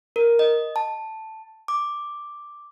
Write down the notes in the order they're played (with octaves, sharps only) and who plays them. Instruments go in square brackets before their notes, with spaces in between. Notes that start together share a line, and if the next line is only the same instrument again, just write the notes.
[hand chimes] A#4
D#5
A5
D6